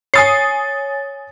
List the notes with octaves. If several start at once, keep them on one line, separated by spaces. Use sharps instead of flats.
C#5 G#5 D#6 A6 C7